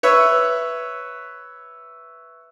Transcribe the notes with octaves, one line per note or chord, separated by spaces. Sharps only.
B4 C#5 E5